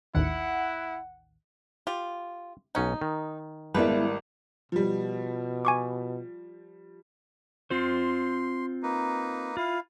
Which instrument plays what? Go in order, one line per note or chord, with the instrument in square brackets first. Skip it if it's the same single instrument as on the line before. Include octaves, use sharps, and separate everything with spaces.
[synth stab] A1 D#2 D#3 [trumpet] E4 [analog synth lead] F#5
[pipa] F4 [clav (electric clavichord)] G4
[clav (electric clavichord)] B1 C#4 F#5 [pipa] D#4
[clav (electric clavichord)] D#3
[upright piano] G#1 G3 A#3 [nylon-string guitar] G#3 B3 E4 [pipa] D4 B4
[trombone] B2 [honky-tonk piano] F3 G3
[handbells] G#5 C#6 D6
[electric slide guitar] C4 F4 C5 [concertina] C6
[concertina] A#3 D#4 B4
[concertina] E4 F5 [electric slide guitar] F4